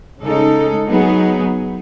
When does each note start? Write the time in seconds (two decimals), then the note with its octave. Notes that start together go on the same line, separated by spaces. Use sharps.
0.21 C#3 G#3 D#4 A4
0.87 F#3 B3 D#4 G#4